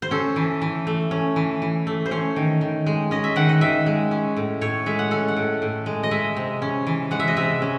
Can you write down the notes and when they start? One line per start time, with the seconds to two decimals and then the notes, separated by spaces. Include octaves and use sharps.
0.02 C5
0.11 C#4 A4
0.36 E3
0.62 E3
0.87 A3
1.11 C#4
1.36 E3
1.62 E3
1.87 A3
2.06 C5
2.11 C#4 C#5
2.36 D#3
2.61 D#3
2.86 G#3
3.11 C#4 D#5
3.24 E5
3.36 D#3 F#5
3.49 D#5
3.61 D#3 E5
3.86 G#3
4.11 C#4
4.36 A2
4.61 A2 C#5
4.86 G#3 E5
4.99 F#5
5.11 C#4 A4
5.28 F#5
5.37 A2
5.62 A2
5.86 G#3
6.03 D#5
6.11 G#3 E5
6.37 C3
6.62 C#4
6.87 E3
7.11 G#3 F#5
7.20 E5
7.28 D#5
7.37 C3 E5
7.62 C#4